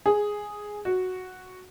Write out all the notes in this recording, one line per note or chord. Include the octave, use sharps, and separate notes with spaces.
G#4
F#4